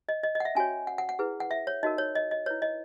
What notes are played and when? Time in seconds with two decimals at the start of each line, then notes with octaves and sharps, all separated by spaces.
0.09 D#5
0.23 D#5
0.35 D#5
0.40 F#5
0.45 E5
0.55 C#4 F#4 C#5 G#5
0.87 F#5
0.98 F#5
1.09 F#5
1.19 E4 G#4 B4
1.40 F#5
1.51 E5
1.67 C#5
1.83 D#4 F#4 A#4 D#5
1.98 C#5
2.15 D#5
2.31 D#5
2.46 E4 B4 C#5
2.62 D#5